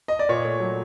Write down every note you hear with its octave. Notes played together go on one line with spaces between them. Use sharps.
D#5
D5
A#2 C#5
A3
F#3